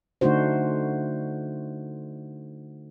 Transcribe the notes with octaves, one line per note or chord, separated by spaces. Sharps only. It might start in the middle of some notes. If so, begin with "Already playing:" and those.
D3 A3 D4 D#4 F#4 C5